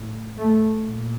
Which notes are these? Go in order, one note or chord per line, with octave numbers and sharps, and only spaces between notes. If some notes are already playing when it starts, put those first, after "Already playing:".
Already playing: A2
A3
A#2